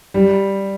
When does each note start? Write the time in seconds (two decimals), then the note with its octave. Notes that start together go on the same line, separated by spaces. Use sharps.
0.14 G3